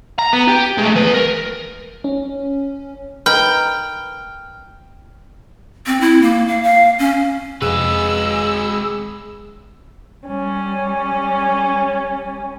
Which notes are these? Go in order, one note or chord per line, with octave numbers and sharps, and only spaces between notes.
A#5
B3
G4
G#3 A3
E2 B4
A#4
C#4
D#4 A#4 B4 G5 F6
C4
E4
A#3
F5
F5
C#4
F2 C3 G#3 G#4 B4 E6
G3 C#4